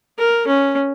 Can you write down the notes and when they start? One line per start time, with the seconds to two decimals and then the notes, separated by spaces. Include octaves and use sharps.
0.18 A#4
0.47 C#4